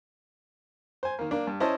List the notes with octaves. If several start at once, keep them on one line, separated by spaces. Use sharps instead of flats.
C5 G#5
D#3 A#3
A#3 D4
G2
C#4 E4 C5 D#5 A5